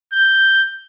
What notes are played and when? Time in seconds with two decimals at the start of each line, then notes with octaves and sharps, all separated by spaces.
0.13 G6